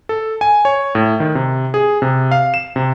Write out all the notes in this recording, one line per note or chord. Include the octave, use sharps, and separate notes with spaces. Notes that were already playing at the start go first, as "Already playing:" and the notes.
A4
G#5
C#5
A2
D#3
C3
G#4
C3
F5
E7
C3